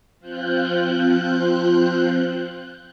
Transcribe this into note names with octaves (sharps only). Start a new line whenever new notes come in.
F3 C4 F4 F#6 G6